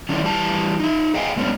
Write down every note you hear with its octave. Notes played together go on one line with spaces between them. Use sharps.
D#3 C#4 D4 E4
E3 G3 A5
D#4 E5
G#4 D#5 F5 G5 G#5
G2 G#3 B3 C#4 D4